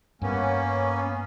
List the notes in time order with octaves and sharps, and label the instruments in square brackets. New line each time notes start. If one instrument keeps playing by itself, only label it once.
[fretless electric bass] G2 [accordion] A#3 B3 C#4